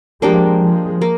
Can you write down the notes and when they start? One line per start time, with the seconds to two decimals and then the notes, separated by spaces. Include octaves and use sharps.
0.21 F3 G#3 A#3 D4 G4
0.61 F3 G#3
1.01 A#3